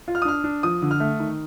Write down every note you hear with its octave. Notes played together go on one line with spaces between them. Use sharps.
F4
F6
D#6
D4 F6
D4
F3 D#6
D3
F6
A3
D#3